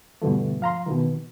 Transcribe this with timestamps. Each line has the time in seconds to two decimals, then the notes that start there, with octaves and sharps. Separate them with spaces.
0.22 G2 B2 D3 E3 A3
0.61 F3 F5 A#5 C6
0.86 B2 D#3 E3